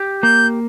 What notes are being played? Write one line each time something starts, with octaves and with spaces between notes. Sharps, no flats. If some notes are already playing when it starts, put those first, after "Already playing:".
Already playing: G4
A#3 G6